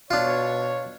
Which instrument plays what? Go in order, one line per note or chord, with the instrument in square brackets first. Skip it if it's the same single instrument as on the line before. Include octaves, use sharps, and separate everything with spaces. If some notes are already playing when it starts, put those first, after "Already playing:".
[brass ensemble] B2 C#5 [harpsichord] D4 F4